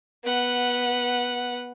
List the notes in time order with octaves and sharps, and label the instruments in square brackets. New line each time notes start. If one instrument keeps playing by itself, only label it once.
[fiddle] B3 F#5